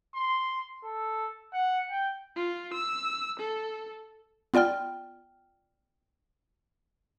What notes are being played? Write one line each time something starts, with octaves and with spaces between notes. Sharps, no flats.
C6
A4
F#5
G5
F4
E6
A4
B3 F4 D5 G5 F6